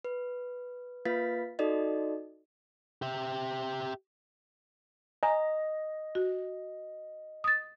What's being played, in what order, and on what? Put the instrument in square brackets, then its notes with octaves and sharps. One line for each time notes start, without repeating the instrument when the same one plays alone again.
[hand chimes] B4
A#3 F4 B4 F5 A6 B6
D#4 F#4 A4 D5 D#5
[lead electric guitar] G4 E5
[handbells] D#5 [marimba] G#5 A#5
[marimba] F#4
D#6 A6